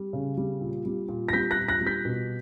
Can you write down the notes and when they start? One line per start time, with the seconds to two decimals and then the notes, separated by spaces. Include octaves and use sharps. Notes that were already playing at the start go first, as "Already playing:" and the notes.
Already playing: G3
0.13 C#3
0.37 G3
0.61 A#2
0.86 G3
1.09 A#2
1.29 A#6
1.33 G3 G6 B6
1.51 F#6 A#6
1.57 A#2
1.68 F#6 A#6
1.81 G3
1.87 G6 B6
2.05 B2